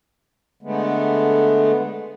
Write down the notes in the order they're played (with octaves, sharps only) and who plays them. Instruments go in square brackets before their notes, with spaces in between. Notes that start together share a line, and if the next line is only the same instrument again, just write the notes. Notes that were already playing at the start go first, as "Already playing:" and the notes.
[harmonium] D3 G#3 A3 B3